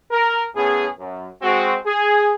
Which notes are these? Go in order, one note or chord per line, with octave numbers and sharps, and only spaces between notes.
A#4
A2 B3 C#4 G#4
F#2
G#3 C4 F#4
G#4